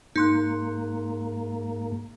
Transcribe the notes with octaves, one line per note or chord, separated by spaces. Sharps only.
G#2 A#3 D#4 C6 F#6